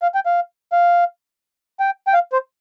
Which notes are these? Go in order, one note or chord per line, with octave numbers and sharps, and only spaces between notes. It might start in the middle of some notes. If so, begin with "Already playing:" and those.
F5
G5
F5
F5
G5
G5
F5
C5